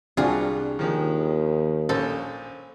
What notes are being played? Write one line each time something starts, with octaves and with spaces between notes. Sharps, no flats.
C2 G3 C4 D4 F4 F#4 G#4
D#2 D#3 F3 G#3
A#1 C#4 A4 C5